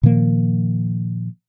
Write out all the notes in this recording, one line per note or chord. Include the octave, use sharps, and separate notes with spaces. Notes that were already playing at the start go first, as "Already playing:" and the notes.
A#2 D#3 F3 A#3